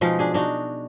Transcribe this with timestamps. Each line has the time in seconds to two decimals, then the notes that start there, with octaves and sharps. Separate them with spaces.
0.01 B2 F3 G#3 D#4
0.19 D4 G#4
0.34 D4 D#4 F#4